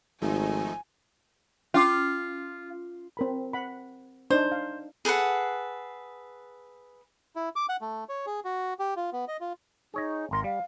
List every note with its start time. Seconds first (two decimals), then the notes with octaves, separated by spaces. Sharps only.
0.22 G#1 F3 A3 D#4 G#5
1.74 C#4 F4 D6
3.17 C4 A#4 B5
3.53 F#5 B5
4.30 D4 D#4 C5
4.52 F5
5.05 G#4 A4 B4 F#5
7.36 E4
7.56 D6
7.69 F#5
7.81 A3
8.09 C#5
8.26 G#4
8.45 F#4
8.79 G4
8.96 F4
9.13 B3
9.28 D#5
9.41 F4
9.94 D#4 G#4 C#5 D#5
10.31 G#1 A#4 A#5 C6
10.44 G3 F5